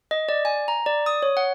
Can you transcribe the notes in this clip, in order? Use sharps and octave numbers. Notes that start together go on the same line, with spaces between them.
D#5
D5
G#5
A#5
D5
D#6
C#5
F#5